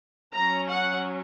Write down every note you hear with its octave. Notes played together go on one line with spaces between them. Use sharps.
F#3 C#4 A#5
F#5